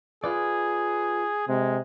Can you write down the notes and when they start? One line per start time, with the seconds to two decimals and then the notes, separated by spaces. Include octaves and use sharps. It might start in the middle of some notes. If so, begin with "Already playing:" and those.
0.24 F4 G#4 B4 D5
1.48 C3 G#3